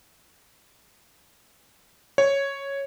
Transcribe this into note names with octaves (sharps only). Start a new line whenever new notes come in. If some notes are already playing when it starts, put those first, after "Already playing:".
C#5